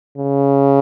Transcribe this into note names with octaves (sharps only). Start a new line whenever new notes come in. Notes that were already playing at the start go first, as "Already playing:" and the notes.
C#3